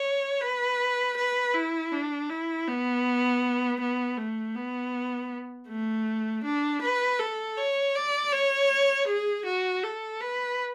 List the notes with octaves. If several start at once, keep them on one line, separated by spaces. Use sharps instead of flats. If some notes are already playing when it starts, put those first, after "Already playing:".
Already playing: C#5
B4
B4
E4
D4
E4
B3
B3
A3
B3
A3
D4
B4
A4
C#5
D5
C#5
G#4
F#4
A4
B4